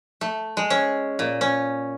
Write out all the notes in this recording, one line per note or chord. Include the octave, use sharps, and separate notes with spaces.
A3
G#3
C#4
A#2
C#4